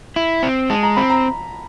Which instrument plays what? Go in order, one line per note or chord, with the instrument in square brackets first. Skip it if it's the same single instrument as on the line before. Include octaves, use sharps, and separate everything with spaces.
[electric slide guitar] E4
C4
[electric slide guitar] G#3 [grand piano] A5
[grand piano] A#5
[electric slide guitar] C4 [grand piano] B5
[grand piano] A#5